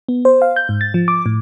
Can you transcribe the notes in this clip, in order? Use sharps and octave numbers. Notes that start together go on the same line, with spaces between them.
B3
C5
F5
G6
G#2
A6
F3
D6
A2